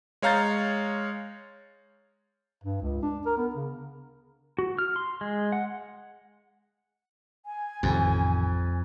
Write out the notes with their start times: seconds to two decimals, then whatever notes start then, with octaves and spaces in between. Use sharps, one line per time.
0.22 G#3 C#5 F5 A#5 G6 A6
2.63 G2
2.81 C#2
3.02 D4
3.25 A#4
3.37 B3
3.55 C#3
4.59 F#4
4.79 F6
4.96 C6
5.21 G#3
5.52 F#5
7.45 G#5
7.83 A1 F2 C3 D#3